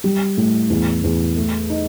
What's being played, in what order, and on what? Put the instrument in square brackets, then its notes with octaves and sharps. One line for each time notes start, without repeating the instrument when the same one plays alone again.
[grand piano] G3
A2
E2
E2
A3
D#4